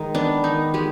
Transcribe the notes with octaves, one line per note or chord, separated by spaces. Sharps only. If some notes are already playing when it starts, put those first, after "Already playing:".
Already playing: D#3 G#3
B3 D4
D#3 D#4
G#3 G4